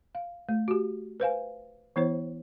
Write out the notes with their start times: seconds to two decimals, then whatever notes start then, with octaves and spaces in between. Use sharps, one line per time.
0.15 F5
0.49 A3
0.68 F#4 G4
1.20 B4 C5 F5 G#5
1.96 E3 B3 E4 C5 C#5